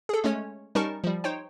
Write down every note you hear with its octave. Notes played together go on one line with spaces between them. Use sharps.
G#4 A4
G#3 A3 C#4 C#5
G3 C#4 D#4 A#4 A5 C#6
F3 G3
D#4 C5 C#5 G5